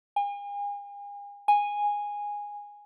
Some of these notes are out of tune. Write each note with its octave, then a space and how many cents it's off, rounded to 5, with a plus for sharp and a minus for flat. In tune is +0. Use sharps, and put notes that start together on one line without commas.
G#5 -40
G#5 -10